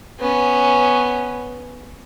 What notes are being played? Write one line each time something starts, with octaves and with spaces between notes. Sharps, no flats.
B3 C#4